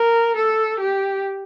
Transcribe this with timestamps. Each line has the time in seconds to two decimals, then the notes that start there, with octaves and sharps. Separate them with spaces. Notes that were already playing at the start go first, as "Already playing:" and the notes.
Already playing: A#4
0.36 A4
0.80 G4